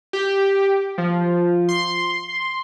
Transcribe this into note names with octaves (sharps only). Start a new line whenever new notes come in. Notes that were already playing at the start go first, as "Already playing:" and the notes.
G4
F3
C6